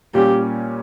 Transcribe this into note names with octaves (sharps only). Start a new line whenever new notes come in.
A#2 G3 A#3 C#4 G4